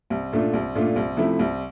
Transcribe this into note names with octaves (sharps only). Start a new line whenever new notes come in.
C2
A#2 A3 D4 F4
C2
A#2 A3 D4 F4
C2
C3 F3 A3 E4
C2